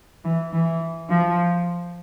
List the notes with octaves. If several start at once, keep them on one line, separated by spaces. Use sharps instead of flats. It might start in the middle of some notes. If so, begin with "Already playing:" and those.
E3
E3
F3